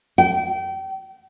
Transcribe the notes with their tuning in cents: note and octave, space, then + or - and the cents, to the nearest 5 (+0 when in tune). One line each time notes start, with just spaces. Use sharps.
G5 -30